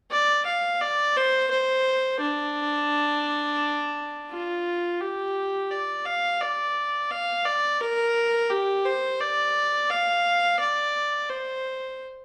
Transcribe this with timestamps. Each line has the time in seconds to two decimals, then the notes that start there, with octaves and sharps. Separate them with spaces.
0.11 D5
0.46 F5
0.81 D5
1.16 C5
1.51 C5
2.21 D4
4.31 F4
5.01 G4
5.71 D5
6.06 F5
6.41 D5
7.11 F5
7.45 D5
7.81 A#4
8.50 G4
8.85 C5
9.20 D5
9.90 F5
10.60 D5
11.30 C5